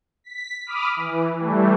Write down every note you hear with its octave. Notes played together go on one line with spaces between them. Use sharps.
B6
B5 D6 D#6 F6
E3
E3 G3 A3